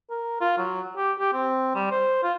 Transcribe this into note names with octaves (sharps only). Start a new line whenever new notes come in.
A#4
F4
F#3
G4
G4
C4
G3
C5
F4